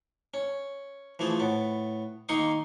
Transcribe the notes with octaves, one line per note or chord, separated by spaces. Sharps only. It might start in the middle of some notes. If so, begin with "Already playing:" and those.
C#4
E3 F3 A3 G#4
A2 B3
D#3 A#3 D#4 C6 C#6 D#6